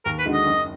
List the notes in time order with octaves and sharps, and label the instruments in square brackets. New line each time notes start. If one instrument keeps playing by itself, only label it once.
[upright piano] D#2 [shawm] A#4
[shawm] B4
[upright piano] D3 G#3 D#4 F#4
[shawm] D#5
[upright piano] F#1